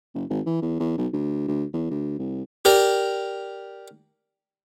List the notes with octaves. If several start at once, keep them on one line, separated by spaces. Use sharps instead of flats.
F#1
G#1
E3
E2
E2
B1
D2
D2
E2
D2
C2
G4 A#4 D5